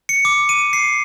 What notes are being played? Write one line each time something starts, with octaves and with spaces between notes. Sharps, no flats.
C#7
D6
D#7
C7